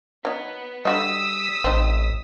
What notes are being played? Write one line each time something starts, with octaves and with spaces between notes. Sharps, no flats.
F#3 B3 D#4
D3 G3 F#4 D#5 D#6 E6 B6
A1 C4 D#4